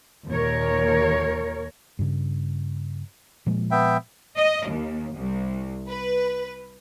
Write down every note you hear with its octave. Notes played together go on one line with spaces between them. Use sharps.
D#2 A#2 A#4 C#5
G2 C#3
A#2 F3 G#3
B3 E5 G5
D#5
D#2
C2
B4